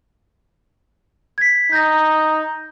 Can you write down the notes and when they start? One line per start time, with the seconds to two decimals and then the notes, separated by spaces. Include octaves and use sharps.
1.38 G#6 B6
1.72 D#4 G6 A#6